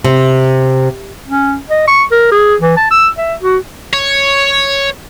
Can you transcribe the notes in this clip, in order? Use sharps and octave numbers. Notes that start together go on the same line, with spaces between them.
C3
C#4
D#5
C#6
A#4
G#4
E3
A5
E6
E5
F#4
C#5